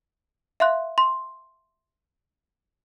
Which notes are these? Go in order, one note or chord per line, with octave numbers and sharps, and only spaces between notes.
E5 F5 C6 F#6
C6